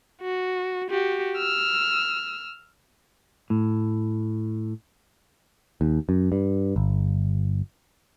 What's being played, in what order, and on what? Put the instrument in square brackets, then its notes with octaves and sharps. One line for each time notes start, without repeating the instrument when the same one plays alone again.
[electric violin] F#4
F#4 G4
E6 F6
[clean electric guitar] A2
[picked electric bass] D#2
F#2
G2
G1